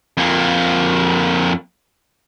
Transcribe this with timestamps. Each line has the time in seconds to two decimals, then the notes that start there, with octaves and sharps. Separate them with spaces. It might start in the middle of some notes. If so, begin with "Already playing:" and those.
0.17 F2 A#3